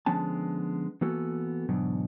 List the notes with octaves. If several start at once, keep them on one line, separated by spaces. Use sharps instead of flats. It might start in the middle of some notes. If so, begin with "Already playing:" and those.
D3 F3 G#3 B3 C#4 A5
E3 A#3 B3 F#4 A4
E2 G#2 B2 D3 F#3